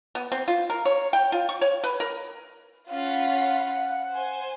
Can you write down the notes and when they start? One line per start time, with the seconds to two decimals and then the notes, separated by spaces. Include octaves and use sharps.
0.15 B3
0.32 C4
0.48 F4
0.70 A#4
0.85 C#5
1.13 G5
1.32 F4
1.49 C#6
1.61 C#5
1.84 B4
2.00 A#4
2.89 C#4 F4 F5 F#5 B5
4.09 C5 G#5